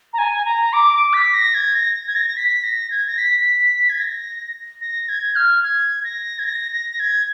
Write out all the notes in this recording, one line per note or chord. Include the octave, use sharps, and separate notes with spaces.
A#5
G#5
A#5
D6
D6
B6
A#6
G#6
A#6
G#6
A#6
B6
A#6
G#6
A#6
B6
G#6
A#6
A#6
G#6
F6
G#6
A#6
G#6
A#6
A#6
G#6